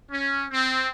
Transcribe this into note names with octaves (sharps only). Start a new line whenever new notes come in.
C#4
C4